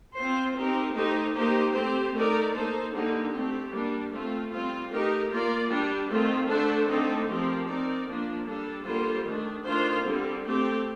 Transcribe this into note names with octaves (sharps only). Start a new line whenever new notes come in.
C4 F4 C5
C4 D#4 G4 A#4
A3 D#4 G4 C5
A#3 D#4 G4 C5
A3 C4 G4 C5
A3 D#4 A#4 D5
A#3 D#4 A4 C5
D3 G3 A#3 D#4 G4
A3 C4 G4
G3 A#3 D4
A3 C4 F4
G3 C4 F4
A3 D#4 G4 A#4
A#3 F4 A#4 D5
G3 D4 G4
D#3 A3 C4 F4
D3 A3 D4 A4 C5
D3 A3 C4 D#4 A4
F3 C4 G4 A#4
C4 D#4 A#4 D5
F3 A#3 D4
G3 D4 A4
D3 G3 A#3 F4 C5
D#3 A3 D4
D#3 A3 D4 F4 C5
D3 G3 C4
A3 C4 G4